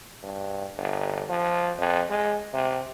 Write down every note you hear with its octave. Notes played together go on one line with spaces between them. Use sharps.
G2
G1
F3
F2
G#3
C3